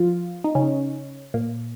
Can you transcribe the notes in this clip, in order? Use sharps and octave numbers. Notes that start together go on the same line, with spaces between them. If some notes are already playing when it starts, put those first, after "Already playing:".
Already playing: F3 F4
D#4
C#3 C#4
A#2 A#3